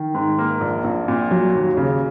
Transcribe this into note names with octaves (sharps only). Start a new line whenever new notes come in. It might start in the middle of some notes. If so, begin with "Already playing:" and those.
Already playing: D#3
G#2
A#3
A#1
A#1
A#2
F#3
D#2
C#3